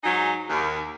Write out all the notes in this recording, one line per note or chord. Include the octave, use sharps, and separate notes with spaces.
G#2 F#3 D#4 G#4
D#2